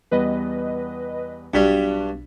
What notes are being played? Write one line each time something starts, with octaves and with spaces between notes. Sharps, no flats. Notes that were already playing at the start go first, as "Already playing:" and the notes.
E2 G3 B3 B4 D#5
B1 G2 G3 D4 F#4 B6